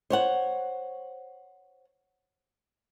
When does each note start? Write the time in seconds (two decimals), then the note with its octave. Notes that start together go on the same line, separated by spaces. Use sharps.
0.10 C5 C#5 F#5